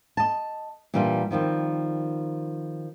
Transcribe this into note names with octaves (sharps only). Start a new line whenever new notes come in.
D#5 A5
A#2 E3 G3 D4 F4
D#3 F3 G3 C4